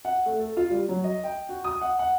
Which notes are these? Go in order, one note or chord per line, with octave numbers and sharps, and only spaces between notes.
F#5
A3
A4
F4
G3
F#3
D#5
G5
F#4
D#6
F#5
F#5